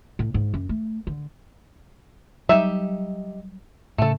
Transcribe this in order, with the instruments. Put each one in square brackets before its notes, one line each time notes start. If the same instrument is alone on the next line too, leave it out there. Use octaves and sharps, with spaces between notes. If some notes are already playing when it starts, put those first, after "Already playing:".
[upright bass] A2
G#2
F#2
A3
D3
[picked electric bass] F#3 G3 [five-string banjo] D#4 G4 E5
[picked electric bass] A2 C#3 [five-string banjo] A3 A4